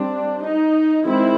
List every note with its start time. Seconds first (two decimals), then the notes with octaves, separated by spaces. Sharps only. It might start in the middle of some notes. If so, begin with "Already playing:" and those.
Already playing: G3 C4 D4
0.43 D#4
1.05 D#3 G#3 C4 E4